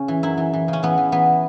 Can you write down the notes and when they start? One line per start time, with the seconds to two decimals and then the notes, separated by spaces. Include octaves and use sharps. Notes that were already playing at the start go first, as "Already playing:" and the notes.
Already playing: C#3 C#4
0.08 E3
0.23 F#2 E4
0.38 E3
0.54 E3
0.68 C#3 C#4
0.83 E3 B3
0.98 E3
1.12 E3 B3